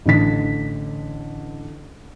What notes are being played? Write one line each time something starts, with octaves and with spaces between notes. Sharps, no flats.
A1 D3 B6